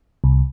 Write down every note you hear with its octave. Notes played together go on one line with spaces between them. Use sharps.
C2